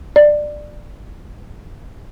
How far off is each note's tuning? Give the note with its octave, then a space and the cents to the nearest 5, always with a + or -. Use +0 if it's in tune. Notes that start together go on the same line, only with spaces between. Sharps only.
D5 +15